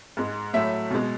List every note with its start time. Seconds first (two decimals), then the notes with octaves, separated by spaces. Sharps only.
0.17 G#2 G#3
0.54 A2 F#3 A3 E5
0.90 B2 G#3